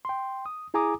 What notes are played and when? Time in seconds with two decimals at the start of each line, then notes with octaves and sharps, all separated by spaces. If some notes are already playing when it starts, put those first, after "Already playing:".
0.05 G5 C6
0.46 D#6
0.74 E4 G#4 G#5 A#5 D6 D#6